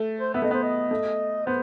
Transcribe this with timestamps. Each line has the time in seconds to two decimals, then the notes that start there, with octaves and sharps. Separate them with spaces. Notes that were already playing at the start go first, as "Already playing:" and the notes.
Already playing: A3
0.20 C5
0.34 B3 E5
0.42 A3 D#5
0.51 B3 C5
0.63 D#5
0.91 A3
1.46 B3 C5